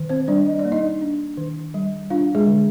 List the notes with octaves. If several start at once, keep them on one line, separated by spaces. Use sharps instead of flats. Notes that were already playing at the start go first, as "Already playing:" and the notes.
Already playing: D#3
C4 C5
G3 D4 D5
D#5
D5
A#3
D#4 D#5
D4
D#3
G3
D4 F4 F5
G#3 G#4
D3